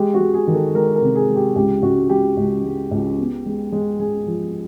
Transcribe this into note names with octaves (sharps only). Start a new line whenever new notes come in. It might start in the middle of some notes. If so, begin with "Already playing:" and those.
Already playing: G#3 G4
F#4
G#3
G#4
D#3
A4
G#3 A#4
A#4
C3
G#4
G#3
G4
C#2 G4
C#2 F#4
G#3 G4
C#2
G#3
C#2
B3
G#3
G#3
G#3 G#4
F3